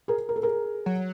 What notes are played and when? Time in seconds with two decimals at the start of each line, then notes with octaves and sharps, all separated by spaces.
0.08 G#4 A#4
0.29 A#4
0.36 A4
0.43 G#4 A#4
0.86 F#3